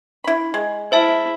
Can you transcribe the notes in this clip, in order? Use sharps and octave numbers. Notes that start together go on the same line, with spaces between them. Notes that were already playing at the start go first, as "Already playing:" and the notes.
E4 B5
G#3
E4 C5 E5 A5